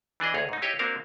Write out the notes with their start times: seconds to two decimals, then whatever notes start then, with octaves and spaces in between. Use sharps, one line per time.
0.20 E3 D4 G#4 D#5
0.34 D2 G#4 C#5
0.49 G#2 D#4
0.62 E4 G4 C#5 D#5 F5
0.79 A#3 C4 D4 F#4 A#4 F5